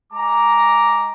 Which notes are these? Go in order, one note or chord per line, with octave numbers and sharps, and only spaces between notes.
G#3 A#5 D6